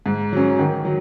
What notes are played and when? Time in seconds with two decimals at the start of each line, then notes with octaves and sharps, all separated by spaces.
0.06 G#2
0.32 F#3 C#4
0.59 D#3
0.85 F#3